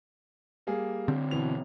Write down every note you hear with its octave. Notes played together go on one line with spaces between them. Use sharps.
G3 A#3 G#4
D3 C4
B2 E3 F7